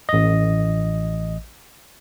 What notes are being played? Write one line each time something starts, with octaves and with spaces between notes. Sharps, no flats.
A1 D#5